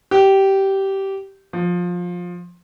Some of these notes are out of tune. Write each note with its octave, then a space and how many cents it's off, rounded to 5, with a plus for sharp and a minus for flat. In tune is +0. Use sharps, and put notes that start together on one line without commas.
G4 -15
F3 +20